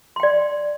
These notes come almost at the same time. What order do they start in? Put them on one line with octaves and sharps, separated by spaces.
C6 G5 D5